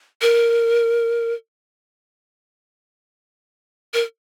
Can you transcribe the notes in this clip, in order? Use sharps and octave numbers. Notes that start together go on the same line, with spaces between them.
A#4
A#4